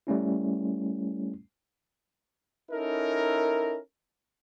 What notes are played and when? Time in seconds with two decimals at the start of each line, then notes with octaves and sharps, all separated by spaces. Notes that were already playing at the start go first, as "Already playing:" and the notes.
0.07 G3 A3 C#4 E4
2.71 C#4 D#4 E4 A4 A#4